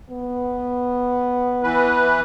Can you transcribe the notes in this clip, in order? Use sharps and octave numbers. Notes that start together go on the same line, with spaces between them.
B3
E3 B4